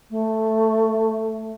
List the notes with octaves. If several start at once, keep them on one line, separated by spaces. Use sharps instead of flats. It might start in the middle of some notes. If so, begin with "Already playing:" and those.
A3